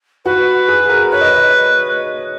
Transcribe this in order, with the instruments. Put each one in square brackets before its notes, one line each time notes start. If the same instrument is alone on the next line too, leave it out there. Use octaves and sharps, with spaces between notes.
[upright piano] F#4 [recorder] B4
[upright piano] G#4
A#4
[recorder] B4 [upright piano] C#5
[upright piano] D#5
D#5